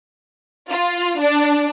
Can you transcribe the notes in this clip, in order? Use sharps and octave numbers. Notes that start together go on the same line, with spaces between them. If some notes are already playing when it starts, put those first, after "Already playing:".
F4
D4